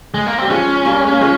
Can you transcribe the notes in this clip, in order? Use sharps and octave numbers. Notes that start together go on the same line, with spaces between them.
G#3
A#3
G3 C4
F3 G#3 C#4
G3 A#3
G#3
A#3
F3 G#3